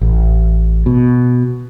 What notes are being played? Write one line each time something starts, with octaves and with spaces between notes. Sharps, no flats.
A1
B2